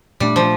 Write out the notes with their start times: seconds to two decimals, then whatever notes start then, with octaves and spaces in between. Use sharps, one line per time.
0.20 A#2 G3 A3 D4
0.36 F3